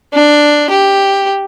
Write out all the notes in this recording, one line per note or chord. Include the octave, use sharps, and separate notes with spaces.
D4
G4